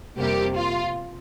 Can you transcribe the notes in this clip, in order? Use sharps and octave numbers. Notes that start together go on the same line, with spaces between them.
F2 C3 G3 A#3 G4
F4